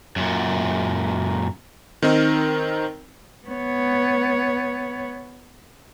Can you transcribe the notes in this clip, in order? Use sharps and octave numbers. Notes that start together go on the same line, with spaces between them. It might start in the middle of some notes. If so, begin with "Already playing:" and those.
F#2 A#2
D#3 C4 D#4 A#4
B3 C#5